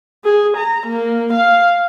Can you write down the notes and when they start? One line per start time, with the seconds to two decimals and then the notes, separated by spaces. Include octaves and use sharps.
0.24 G#4
0.57 A#5
0.87 A#3
1.33 F5